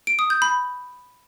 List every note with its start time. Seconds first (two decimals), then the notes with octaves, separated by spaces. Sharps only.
0.07 D7
0.19 D#6
0.30 G6
0.42 B5